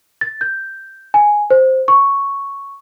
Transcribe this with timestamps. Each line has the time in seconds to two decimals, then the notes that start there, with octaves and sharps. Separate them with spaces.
0.21 A6
0.41 G6
1.14 G#5
1.50 C5
1.88 C#6